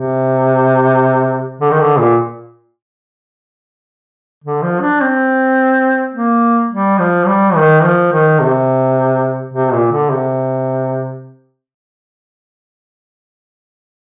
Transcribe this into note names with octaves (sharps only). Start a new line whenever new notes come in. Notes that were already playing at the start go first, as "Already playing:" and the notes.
Already playing: C3
D3
D#3
D3
A#2
D3
F3
D4
C4
A#3
G3
F3
G3
D#3
F3
D#3
C3
C3
A#2
D3
C3